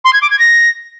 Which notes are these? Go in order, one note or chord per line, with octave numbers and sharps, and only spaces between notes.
C6
G#6
D6
G#6
A#6